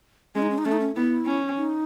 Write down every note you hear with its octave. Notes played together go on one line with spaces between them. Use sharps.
G#3 C#4
D#4
C#4
D#4
A3 C#4
D#4
C#4
B3 E4
C#4
D#4